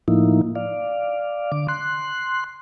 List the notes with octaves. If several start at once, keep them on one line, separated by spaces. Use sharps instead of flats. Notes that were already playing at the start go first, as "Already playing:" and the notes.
A2 F3 A#3 D#4 E4
D5 F5
D3 D6
C6 F#6